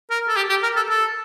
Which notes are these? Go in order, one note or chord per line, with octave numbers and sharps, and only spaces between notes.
A#4
A4
G4
G4
A#4
A4
A4